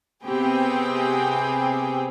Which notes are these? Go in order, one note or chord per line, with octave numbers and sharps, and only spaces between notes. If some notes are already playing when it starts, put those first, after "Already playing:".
C3 B3 C4 G4 G#4 G5